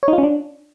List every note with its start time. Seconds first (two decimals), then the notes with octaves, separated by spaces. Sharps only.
0.03 C#5
0.08 D#4
0.13 F4
0.18 C#4
0.23 D4